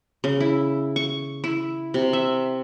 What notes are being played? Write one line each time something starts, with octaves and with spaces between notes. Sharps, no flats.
C#3
E4
C#6
E4
C3
E5